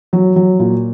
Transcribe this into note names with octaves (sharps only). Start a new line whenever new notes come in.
F#3
F#3
A#2